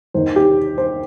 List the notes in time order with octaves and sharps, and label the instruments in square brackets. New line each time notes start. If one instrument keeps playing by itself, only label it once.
[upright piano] D#2 D#3 C5
G4
C5